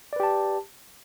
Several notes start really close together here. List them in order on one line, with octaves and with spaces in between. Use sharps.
D5 B4 G4 A5